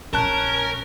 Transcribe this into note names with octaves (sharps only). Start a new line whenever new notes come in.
A#1 C#4 A#4 A5 F#6